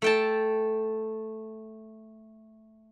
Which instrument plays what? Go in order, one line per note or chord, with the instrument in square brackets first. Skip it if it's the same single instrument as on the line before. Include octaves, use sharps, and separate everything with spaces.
[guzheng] A3 G5 A5